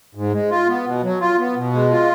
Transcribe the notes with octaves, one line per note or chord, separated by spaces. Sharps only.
G#2
G#3
F4
B3
B2
F#3
F4
B3
B2
G#3
F4